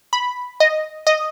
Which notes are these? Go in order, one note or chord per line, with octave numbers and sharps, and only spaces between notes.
B5
D#5
D#5